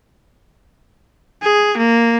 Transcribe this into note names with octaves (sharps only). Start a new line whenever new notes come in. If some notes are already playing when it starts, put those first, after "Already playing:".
G#4
A#3